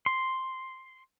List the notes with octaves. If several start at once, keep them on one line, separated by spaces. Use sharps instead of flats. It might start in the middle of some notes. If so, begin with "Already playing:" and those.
C6